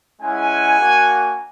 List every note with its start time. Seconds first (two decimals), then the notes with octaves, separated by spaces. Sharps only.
0.21 G#3 C#4 E4 F#5 G#5
0.77 A#3 D4 F#4